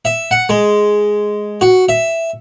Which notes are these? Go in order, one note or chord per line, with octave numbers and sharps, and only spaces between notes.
E5
F#5
G#3
F#4
E5